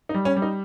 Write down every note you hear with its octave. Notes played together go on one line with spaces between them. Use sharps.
D#4
G3
C#4
G3
D#4